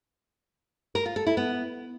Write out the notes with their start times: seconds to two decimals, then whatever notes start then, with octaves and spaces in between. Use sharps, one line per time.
0.95 A#4
1.06 F4
1.16 A4
1.27 E4
1.37 B3